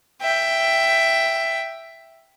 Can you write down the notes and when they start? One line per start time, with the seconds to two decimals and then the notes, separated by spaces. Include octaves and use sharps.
0.22 E5 G5